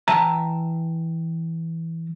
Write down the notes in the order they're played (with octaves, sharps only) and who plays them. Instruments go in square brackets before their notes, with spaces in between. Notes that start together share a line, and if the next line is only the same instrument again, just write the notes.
[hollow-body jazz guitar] E3 E5 G5 A5 A#5